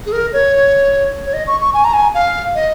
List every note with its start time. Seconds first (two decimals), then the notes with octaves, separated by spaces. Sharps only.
0.06 G#4
0.12 A#4
0.33 C#5
1.26 C#5
1.34 D#5
1.47 C#6
1.61 C#6
1.74 G#5
1.84 A#5
1.94 G#5
2.14 F5
2.55 D#5